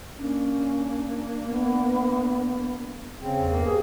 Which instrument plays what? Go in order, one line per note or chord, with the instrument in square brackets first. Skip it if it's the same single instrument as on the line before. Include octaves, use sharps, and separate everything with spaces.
[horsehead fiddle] A#3 D4 [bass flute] C#4
[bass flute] B3
[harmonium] C#3 C4
[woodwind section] E2
[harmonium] G2 A#3
[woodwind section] G#4